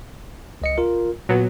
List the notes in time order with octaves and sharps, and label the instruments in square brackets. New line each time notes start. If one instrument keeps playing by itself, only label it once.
[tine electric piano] C#2 D#5 C#7
F4 A#4
[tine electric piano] A#2 [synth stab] F#3 B3